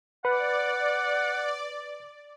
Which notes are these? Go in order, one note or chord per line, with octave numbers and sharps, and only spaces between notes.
B4 D5 F#5